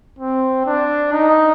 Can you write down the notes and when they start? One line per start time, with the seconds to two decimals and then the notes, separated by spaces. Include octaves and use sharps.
0.19 C4
0.66 D4
1.13 D#4